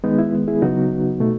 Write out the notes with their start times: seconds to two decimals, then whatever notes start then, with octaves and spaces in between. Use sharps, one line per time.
0.04 D#3 G#3 B3 D#4
0.18 E4
0.48 E4 G#4
0.62 C#3 F#3 B3 D#4 F#4
1.20 B2 A3